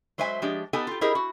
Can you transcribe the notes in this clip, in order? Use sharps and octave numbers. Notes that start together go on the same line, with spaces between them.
F#3 G#3 C5 E5 G#5
F3 G#3 D4 G4
B3 D#4 G4 A4 G#5
F4 G4
E4 G4 G#4 A#4 C5 D#5
F#4